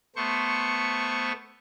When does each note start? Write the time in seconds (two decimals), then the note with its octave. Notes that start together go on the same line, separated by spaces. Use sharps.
0.16 A3 B3 C5 C#6